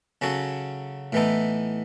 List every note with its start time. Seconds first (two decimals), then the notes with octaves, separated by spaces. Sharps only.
0.22 C#3 F#3 C#4 F#4 A4
1.13 A2 E3 B3 D#4 A4